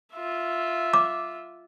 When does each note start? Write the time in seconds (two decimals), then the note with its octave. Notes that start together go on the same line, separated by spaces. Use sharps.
0.14 F4 E5
0.93 D6